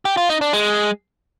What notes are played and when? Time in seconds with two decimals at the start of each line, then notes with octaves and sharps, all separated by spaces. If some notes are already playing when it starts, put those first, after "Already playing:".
0.05 G4
0.17 F4
0.29 D#4
0.41 D4
0.53 G#3